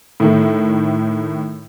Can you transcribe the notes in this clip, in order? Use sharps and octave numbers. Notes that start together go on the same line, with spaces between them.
A2 D#3 A3